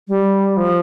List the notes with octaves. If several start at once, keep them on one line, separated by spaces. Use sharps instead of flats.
G3
F3